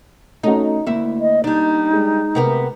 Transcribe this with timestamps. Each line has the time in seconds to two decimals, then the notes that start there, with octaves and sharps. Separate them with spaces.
0.43 A3 C#4 D#4 F#4
0.87 D2 A#3 E4
1.20 D#5
1.44 G3 D4 D#4
1.93 G#3
2.35 C3 B3 A#4